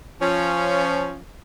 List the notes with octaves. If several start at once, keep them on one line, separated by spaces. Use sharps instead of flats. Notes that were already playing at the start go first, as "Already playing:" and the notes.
F3 C#4